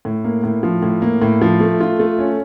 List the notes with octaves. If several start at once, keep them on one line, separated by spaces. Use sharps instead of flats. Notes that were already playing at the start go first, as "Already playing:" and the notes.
A2
A#3
A2
F3
A2
A#3
A2
F3
A3
F4
A3
C#4